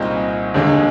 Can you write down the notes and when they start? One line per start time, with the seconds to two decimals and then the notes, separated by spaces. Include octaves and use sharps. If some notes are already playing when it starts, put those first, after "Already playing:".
Already playing: C2 A#2 G#3 C4 D#4
0.54 D#2 D3 G#3 D#4